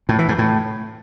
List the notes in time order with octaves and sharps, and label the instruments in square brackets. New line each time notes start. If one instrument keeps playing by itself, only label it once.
[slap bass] A2
E3
G#2
A2